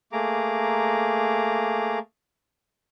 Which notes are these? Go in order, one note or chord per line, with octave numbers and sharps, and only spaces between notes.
A3 A#3 G#4 A#5 D6